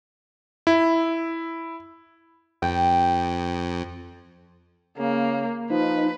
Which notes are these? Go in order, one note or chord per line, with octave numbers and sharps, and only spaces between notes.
E4
F2 G5
C#3 A#3
F3 D#4 B4